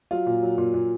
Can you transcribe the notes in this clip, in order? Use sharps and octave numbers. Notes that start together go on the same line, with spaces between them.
F#3 F4
A#2
F#3
A#2
A#2